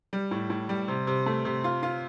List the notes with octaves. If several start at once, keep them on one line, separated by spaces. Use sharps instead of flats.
G3
A2
A2
G3
C3
C3
A3
C3
F4
F4